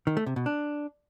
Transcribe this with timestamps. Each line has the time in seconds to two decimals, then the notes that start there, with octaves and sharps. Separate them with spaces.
0.07 D#3
0.17 A3
0.26 C3
0.36 B2
0.46 D4